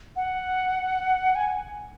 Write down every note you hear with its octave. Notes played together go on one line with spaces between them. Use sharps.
F#5
G#5